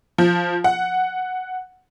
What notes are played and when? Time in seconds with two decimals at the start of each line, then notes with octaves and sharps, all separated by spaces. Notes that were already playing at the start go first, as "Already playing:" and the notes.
0.18 F3
0.64 F#5